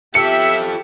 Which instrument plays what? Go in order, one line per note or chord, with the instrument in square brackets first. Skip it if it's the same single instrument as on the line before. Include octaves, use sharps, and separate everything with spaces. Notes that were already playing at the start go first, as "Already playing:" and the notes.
[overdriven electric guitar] F4 A4 [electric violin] G4 [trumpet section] E5 [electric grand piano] C#7